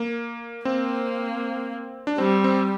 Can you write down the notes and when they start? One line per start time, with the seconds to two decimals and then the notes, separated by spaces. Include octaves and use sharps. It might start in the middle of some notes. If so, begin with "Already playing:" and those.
Already playing: A#3
0.65 A#3 C4
2.07 D4
2.18 G3 C4
2.44 C4